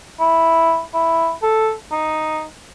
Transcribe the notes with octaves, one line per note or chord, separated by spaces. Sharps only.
E4
E4
A4
D#4